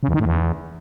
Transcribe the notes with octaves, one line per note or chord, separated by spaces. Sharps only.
C#3
E2
D#3
A2
E2